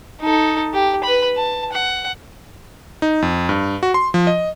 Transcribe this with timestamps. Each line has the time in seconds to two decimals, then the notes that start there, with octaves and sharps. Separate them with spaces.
0.21 D#4 A4
0.73 G4
1.04 B4 B5
1.37 A5
1.72 F#5
3.02 D#4
3.22 F2
3.49 G2
3.83 F#4
3.94 C6
4.14 F3
4.27 D#5